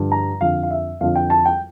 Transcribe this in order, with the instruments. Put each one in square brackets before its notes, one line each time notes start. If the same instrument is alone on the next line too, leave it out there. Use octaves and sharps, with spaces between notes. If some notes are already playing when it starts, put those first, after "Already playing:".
Already playing: [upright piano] G2 D3 F3
A#5
F2 D3 F3 F5
F5
E5
F2 D3 F3 F5
G5
A5
G5